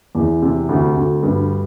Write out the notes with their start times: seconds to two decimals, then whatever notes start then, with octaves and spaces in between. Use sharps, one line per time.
0.15 E2
0.42 C3
0.69 D2
0.96 D2
1.23 G2